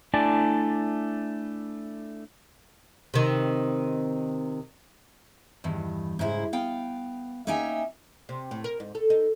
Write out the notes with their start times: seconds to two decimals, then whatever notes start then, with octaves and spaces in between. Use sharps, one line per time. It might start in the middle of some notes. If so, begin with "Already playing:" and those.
0.14 A3 D4 E4 D5 G#5 A5
3.14 C3 D#3
5.64 E2 G2 D#3
6.19 G#2 C#3 E4 C5
6.53 B3 F5 G5
7.47 A#3 C#4 D#4 E5 G5 G#5
8.29 C3
8.51 A2
8.64 A#4
8.80 G#2
8.95 A4
9.10 D#4